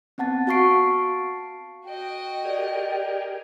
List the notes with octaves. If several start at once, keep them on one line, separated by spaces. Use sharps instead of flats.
B3 C4 F#5 A5 A6
F#4 F5 A5 C#6 C7 D7
F#4 D#5 G5
G4 G#4 A#4 D5